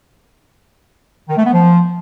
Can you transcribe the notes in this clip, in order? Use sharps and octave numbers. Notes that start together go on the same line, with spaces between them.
D#3
A3
B3
F3